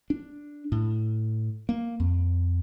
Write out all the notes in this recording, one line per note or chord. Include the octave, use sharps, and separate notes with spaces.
D4
A2
A#3
F2